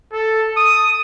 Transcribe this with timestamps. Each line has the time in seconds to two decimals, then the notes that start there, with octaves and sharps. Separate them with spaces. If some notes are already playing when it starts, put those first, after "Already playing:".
0.12 A4
0.57 D#6